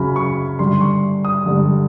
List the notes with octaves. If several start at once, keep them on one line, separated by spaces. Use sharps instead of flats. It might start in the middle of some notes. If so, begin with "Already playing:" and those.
Already playing: F#2 C#3 F#3 B5
C#6
G2 D3 G3 C6
C#6
D#6
G2 D3 G3